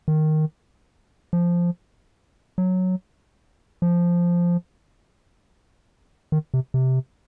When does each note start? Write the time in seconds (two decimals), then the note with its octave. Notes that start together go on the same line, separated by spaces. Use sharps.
0.08 D#3
1.33 F3
2.58 F#3
3.82 F3
6.32 D#3
6.54 C3
6.74 C3